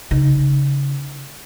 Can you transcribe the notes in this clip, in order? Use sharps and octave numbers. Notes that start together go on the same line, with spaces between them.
C#3 D#4